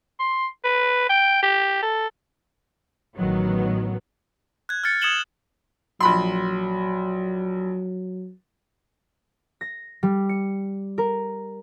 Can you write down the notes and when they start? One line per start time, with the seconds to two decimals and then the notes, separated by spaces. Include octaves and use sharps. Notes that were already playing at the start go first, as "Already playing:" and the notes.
0.19 C6
0.64 B4
1.09 G5
1.43 G4
1.83 A4
3.17 A1 D#3 F#3 B3
4.69 F#6 G#6
4.84 F6 G#6 A6 C#7
5.01 D#6 G#6 C#7 E7 F#7 G7
6.00 A#1 F#3 B5 C6
9.61 A#6
10.03 G3
10.29 C#7
10.98 A#4